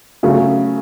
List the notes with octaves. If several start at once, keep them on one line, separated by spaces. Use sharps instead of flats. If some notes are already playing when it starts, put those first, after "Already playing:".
C#3 F#3 A3